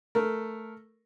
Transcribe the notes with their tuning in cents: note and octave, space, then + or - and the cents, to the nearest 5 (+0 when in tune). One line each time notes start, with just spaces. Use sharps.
A3 +0 A#4 +0